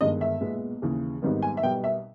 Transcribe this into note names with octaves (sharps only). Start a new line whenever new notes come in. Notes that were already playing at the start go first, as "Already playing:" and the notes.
G1 G2 D#3 G#3 D#5
E5
B1 A#2 G#3 B3
D#2 C#3 E3
G#1 G#2 D#3 G3 B3
G#5
E5
B1 B2 G3 B3 G5
E5